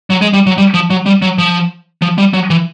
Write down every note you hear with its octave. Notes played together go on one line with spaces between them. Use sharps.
F#3
G#3
G3
F#3
G3
F3
F#3
G3
F#3
F3
F3
G3
F#3
E3